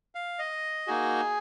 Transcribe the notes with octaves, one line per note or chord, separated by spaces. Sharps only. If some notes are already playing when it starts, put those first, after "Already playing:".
F5
D#5
A#3 D#4 F#4 G#4